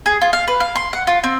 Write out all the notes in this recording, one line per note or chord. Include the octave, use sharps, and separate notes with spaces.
G#4
F4
F5
B4
F5
C6
F#5
F4
C4